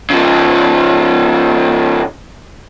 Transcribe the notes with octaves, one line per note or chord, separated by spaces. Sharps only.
C#3 F3